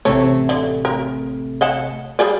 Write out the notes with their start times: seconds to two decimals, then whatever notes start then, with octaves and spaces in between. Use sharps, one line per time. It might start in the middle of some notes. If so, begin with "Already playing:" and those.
0.05 A1 C3 A3 C#5
0.49 D3
0.85 A#4
1.61 D#5 F#5 A5
2.19 G3 G#4 D5